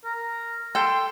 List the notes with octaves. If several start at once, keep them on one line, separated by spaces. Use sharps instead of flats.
A#4
A4 G5 C6